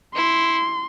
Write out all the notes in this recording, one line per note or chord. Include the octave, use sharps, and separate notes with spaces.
E4 C6